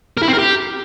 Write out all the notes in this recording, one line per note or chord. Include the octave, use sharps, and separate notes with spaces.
A#4
E4
C4
A#4
G4